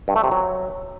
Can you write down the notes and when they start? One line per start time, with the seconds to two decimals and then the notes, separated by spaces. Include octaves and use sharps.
0.08 G2
0.16 A3
0.24 C3
0.31 F#3